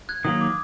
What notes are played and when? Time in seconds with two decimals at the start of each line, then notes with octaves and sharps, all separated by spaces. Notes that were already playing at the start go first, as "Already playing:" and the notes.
0.09 F#6 G#6
0.24 D#3 F#3 A#3 D#6
0.41 D6